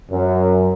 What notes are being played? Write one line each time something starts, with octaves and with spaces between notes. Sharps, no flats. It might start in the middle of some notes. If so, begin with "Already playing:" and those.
F#2